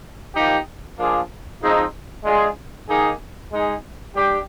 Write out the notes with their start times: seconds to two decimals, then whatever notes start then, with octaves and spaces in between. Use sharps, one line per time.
0.34 F3 A#3 D#4 G4
0.98 F3 A#3 D4 F4 G#4
1.62 F3 G#3 C4 D#4
2.25 G#3 D4 F4 G#4
2.88 D#3 A#3 D#4 G#4
3.52 G#3 D#4 G#4
4.15 G3 D4 G4